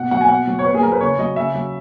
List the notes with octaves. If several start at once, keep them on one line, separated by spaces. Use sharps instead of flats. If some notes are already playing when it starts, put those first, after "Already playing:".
Already playing: B2 F#5
F#3 F#5
G#5
B2 F#5
F#3
C#5
A#2 B4
G#4
F#3 A#4
B4
C#3 C#5
F#3 D#5
C#3 E5
F#3